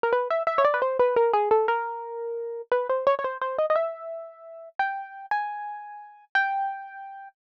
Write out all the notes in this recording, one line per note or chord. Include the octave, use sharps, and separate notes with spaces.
A#4
B4
E5
E5
C#5
D5
B4
C5
B4
A#4
G#4
A4
A#4
B4
C5
C#5
C#5
C5
C5
D#5
D#5
E5
G5
G#5
G5